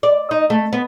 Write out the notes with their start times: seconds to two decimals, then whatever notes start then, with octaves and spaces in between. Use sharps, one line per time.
0.03 D5
0.31 D#4
0.50 A3
0.73 B3